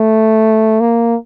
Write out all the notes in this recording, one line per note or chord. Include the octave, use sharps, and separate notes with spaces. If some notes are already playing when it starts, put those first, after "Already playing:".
Already playing: A3
A#3